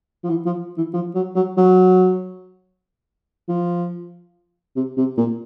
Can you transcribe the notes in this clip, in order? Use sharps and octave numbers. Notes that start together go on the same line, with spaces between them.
F3
E3
F3
E3
F3
F#3
F#3
F#3
F3
C3
C3
A#2